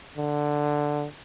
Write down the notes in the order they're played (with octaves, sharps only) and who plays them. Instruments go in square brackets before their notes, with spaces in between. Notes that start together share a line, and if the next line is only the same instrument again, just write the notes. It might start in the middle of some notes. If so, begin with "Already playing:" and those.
[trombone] D3